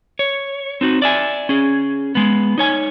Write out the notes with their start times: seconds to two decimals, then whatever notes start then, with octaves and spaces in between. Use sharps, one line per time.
0.19 C#5
0.81 C4 D#4 F#4
1.02 D5 E5 G#5
1.49 C#4 G#4
2.15 G#3 B3
2.58 D#4 C#5 G#5